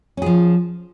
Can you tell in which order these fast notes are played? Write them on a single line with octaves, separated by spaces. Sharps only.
C#4 G#4 F3